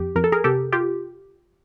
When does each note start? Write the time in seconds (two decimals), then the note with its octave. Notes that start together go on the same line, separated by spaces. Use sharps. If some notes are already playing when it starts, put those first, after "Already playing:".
Already playing: F2 G4
0.16 F2 A#4
0.24 A4
0.32 G#4 A#4
0.44 C3 G4 A4
0.72 F4 G4